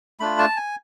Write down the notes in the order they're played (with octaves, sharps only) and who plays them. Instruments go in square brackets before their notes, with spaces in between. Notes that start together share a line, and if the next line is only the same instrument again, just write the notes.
[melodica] A3 D4 F4 B5
A5
G#5